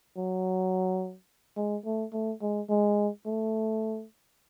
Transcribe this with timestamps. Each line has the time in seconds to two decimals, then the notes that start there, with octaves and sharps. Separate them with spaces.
0.17 F#3
1.57 G#3
1.85 A3
2.13 A3
2.42 G#3
2.70 G#3
3.26 A3